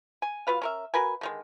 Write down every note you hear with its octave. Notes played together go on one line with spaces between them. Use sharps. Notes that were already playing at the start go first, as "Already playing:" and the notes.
G#5
F#3 F4 B4 F5
C#4 A#4 E5
F#4 A#4 B4 G#5
D3 D#3 G#3